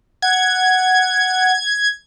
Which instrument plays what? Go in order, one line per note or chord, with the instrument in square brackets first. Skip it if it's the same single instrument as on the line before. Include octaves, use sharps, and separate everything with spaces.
[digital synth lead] F#5 [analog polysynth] G#6